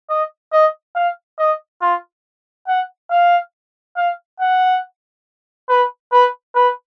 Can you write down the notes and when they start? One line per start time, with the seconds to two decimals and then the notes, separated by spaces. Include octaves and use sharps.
0.10 D#5
0.53 D#5
0.95 F5
1.39 D#5
1.81 F4
2.68 F#5
3.11 F5
3.97 F5
4.40 F#5
5.70 B4
6.12 B4
6.55 B4